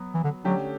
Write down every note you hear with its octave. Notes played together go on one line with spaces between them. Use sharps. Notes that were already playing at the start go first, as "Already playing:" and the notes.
Already playing: F#3 B3
E3
D3
D3 F#3 A3 C#4 G4